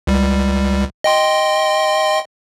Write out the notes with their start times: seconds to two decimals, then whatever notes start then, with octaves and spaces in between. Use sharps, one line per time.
0.07 C#2 G3
1.04 D#5 G5 C6